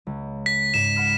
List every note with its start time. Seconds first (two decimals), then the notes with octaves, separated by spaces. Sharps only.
0.07 C#2
0.46 B6
0.74 G#2 E7
0.96 F#5 B5 F6